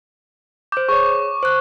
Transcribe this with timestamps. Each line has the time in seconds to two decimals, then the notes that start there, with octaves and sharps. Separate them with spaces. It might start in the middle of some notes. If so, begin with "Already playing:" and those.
0.72 C5 D6 G6
0.89 G#4 C#5 C#6
1.43 C5 F#6